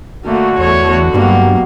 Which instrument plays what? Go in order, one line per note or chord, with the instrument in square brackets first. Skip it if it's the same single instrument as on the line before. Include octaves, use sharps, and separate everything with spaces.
[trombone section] D3 F#4 [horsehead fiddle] A3 A#3
[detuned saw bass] E2 [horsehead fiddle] A3 C#5
[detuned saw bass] G2 [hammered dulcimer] B2 G3 C#6 [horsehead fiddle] F#3 A#3